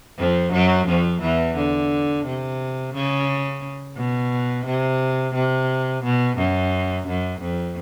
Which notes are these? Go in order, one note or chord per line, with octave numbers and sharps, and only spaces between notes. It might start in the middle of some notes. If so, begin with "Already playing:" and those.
F2 F3
F#2 F#3
F2 F3
E2 E3
D3
C3
C#3
B2
C3
C3
B2
F#2
F#2
F2